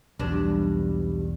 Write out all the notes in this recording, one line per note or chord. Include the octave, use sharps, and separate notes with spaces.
B1 E2 G2 B2 D4